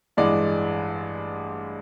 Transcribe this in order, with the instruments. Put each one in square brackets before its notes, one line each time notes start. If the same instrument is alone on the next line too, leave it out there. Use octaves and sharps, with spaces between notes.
[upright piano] A1 G2 E3 G#3 D5